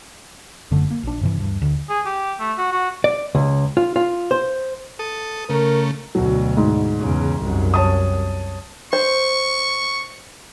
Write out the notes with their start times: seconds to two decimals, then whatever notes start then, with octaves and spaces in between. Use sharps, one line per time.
0.71 F#1 F#2 D3 A3
0.91 A#3
1.03 A#1 D4
1.21 G2 C3 E3
1.37 D1 G2
1.62 D2
1.89 G#4
2.06 G4
2.40 A3
2.58 F#4
2.72 F#4
3.04 D5
3.35 C#2
3.77 F4
3.96 F4
4.31 C5
4.99 A4 D#6
5.50 C#3 A3 A#4
6.15 D2 B2 F#3
6.57 G#2
6.99 E2 C#3
7.41 C2 F#2
7.74 C#5 A5 D#6
8.93 C5 C#6